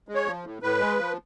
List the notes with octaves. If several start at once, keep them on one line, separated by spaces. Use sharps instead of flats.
G#3
C#5
F3
A2
A2 B4
G#3
F3